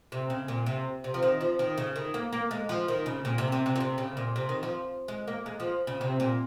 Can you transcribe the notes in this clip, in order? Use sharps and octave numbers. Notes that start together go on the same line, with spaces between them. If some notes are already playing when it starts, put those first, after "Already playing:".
C3
C#3
A#2
C3
C3
F3
D#3
F3
D#3
C#3
D#3
A#3
A#3
G#3
F3
D#3
C#3
A#2
C3
C3
C3
A#2
C3
C#3
A#2
C3
D#3
F3
G#3
A#3
G#3
F3
C#3
C3
A#2